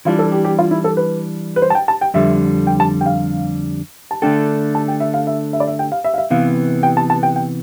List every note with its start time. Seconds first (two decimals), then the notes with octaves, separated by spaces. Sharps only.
0.05 E3 G3 D4 F4
0.19 A4
0.32 G4
0.45 G4
0.59 F4
0.71 E4
0.84 A4
0.97 B4
1.56 B4
1.62 C5
1.70 A5
1.75 G5
1.88 A5
2.01 G5
2.14 F2 D3 G3 E5
2.67 G5
2.80 A5
3.01 G5
3.06 F5
4.11 A5
4.22 D3 A3 D4 A4 G5
4.75 A5
4.88 G5
5.00 E5
5.14 F5
5.27 E5
5.53 E5
5.60 D5
5.68 E5
5.79 G5
5.92 F5
6.04 E5
6.14 F5
6.18 E5
6.30 C3 E3 B3 F5
6.83 G5
6.97 A5
7.10 A5
7.23 G5
7.36 G5